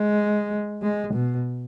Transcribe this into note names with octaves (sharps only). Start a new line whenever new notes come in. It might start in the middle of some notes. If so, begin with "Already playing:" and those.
Already playing: G#3
G#3
B2